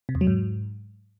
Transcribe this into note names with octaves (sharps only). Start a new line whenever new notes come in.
C3
E2
F#3
G#2